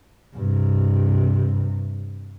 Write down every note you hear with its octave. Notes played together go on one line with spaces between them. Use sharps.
G2 C3